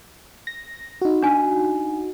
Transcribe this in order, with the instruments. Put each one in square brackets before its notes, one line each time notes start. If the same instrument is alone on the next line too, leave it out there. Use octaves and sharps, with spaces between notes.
[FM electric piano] A#6
D#4 F#4
[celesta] D4 G#5